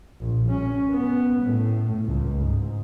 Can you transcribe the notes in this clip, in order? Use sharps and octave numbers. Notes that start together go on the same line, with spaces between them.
A#1
C#4
B3
A2
C#2
G#2